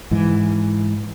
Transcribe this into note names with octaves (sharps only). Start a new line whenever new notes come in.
G#2 E3